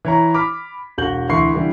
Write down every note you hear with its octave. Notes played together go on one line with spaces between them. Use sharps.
E3 C#5 A#5
B5 D6 F6 B6
E1 F#4 G6 F#7
D2 E3 C6 C#6 C7
D3 E3 G3